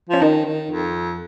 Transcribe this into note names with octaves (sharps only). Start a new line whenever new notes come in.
F3 C#4
D#3 D#4
D#3
F2